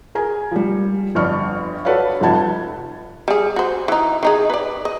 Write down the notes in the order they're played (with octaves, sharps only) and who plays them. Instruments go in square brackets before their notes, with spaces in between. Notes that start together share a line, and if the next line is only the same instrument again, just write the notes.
[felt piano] G#4 A#4 G#5
F3 G3
G1 F2 D4 C#6 F6
F#4 A4 B4 C#5 D5 F5
F1 G2 F3 F#5 A5 G#6
[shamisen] G3 G#4
F#4 C5
E3 D#4
D#3 D#4 G#4
B4 D5
D#5